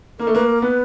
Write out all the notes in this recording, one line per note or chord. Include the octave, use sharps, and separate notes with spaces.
A#3 A#4
A3
A#3 B4
A#4
B3 B4